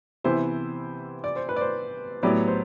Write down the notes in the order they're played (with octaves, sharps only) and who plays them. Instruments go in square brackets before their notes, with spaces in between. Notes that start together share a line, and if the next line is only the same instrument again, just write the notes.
[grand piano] C3 E3 B3 E4 G4 [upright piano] C5
[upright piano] D5
C5
B4
D5
C5
[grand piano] A2 F#3 B3 E4 G4 [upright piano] D5
[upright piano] C5